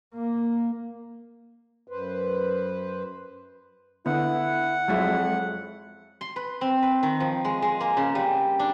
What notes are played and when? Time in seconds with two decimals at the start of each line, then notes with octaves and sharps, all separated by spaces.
0.14 A#3
1.87 F#2 B4 C5
4.06 D3 B3 E4 F#5
4.88 F2 F#3 G#3 E4
6.21 C6
6.36 B4
6.61 C4
6.82 B4
7.03 D#3
7.20 F3
7.45 G#3
7.62 G#3
7.81 A#3
7.97 C#3
8.15 G3
8.59 D4